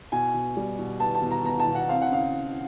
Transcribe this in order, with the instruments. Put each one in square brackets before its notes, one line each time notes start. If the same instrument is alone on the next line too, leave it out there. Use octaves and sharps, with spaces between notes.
[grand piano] B2 G#5
B2
G3
B2
B3 A5
A5
B2
A#5
B3 A#5
A5
B2
F#5
C4 F5
F#5
C#3 F5